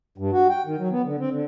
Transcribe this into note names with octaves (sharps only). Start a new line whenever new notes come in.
G2
F#4
G5
D#3
F#3
B3
D3
C4
D3